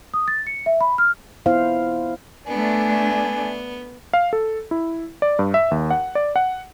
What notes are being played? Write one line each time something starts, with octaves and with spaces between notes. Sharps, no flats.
D#6
A6
C#7
E5
B5
F6
B3 E4 C5 F5
A3 B3 D4 G#5
F5
A4
E4
D5
G2
E5
D#2
F#5
D5
F#5